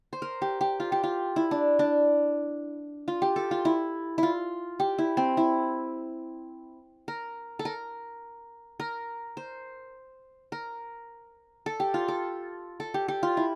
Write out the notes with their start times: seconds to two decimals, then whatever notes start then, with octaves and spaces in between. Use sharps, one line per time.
0.13 C5
0.22 A#4
0.42 G4
0.61 G4
0.80 F4
0.92 G4
1.03 F4
1.36 E4
1.51 D4
1.79 D4
3.08 F4
3.22 G4
3.36 A4
3.51 F4
3.65 E4
4.18 E4 F4
4.80 G4
4.98 E4
5.17 C4
5.37 E4
7.08 A#4
7.59 A4
7.65 A#4
8.80 A#4
9.37 C5
10.52 A#4
11.66 A4
11.80 G4
11.94 F4
12.08 A4
12.80 A4
12.94 G4
13.08 G4
13.23 F4
13.37 E4